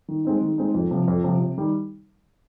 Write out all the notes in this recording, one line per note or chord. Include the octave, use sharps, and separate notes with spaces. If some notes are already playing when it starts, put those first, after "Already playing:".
D#3
G#3 C4 D#4
D#3
G#3 C4 D#4
F2
C3 F3
F2
C3 F3
C3
D#3 G3